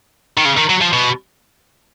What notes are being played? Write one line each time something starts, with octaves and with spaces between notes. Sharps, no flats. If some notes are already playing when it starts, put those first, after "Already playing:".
D#3
C#3
D#3
F#3
F3
B2